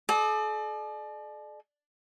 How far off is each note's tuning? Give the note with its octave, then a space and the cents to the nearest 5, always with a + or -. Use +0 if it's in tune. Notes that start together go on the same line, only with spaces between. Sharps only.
A4 -45 D5 +40